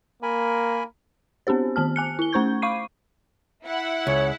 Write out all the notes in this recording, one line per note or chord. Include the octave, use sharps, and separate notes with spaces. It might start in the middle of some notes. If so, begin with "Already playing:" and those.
A#3 A#4 G#5 B5
B3 C4 D4 G4 C5
D#3 B3 A5 F6
G#5 F#6 C#7
E4 G7
A3 C#4 C5 C#6 G6 G#6
F5 B5 C#6 D6 C7 D#7
E4 F#5
C#2 C#5